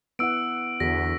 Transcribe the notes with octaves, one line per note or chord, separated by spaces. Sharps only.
B3 E4 F#5 E6 D7
E2 D3 F#4 A#6 B6